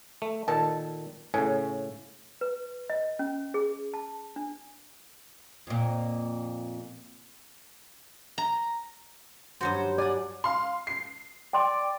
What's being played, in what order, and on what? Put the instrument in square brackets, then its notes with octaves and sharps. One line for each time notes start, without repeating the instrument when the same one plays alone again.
[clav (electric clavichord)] A3
[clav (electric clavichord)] A#2 D#3 A4 [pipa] A5
[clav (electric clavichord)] A2 C#3 [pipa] C#4
[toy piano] B4
D#5
C#4
G#4
A5
D4
[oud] F2 A#2
[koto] A#5
[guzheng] G2 F#3 F#4 [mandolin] C5
[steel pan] D5 [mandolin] F#5 G#5
[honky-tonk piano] F5 C6
C7
[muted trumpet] D5 [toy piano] G5 C6